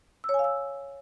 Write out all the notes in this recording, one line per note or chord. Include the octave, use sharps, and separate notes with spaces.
E6
C#5
G#5
F5
E6